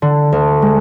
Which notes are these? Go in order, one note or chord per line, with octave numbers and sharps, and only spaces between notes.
D3
D2
G#3